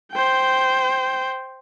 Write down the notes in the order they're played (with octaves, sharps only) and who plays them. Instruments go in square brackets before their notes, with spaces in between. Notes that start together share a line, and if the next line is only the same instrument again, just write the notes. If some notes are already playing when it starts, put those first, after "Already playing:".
[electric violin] C5 G5